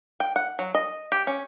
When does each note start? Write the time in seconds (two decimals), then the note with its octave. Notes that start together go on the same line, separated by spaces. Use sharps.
0.20 G5
0.36 F#5
0.59 F#3
0.75 D#5
1.12 G4
1.27 C#4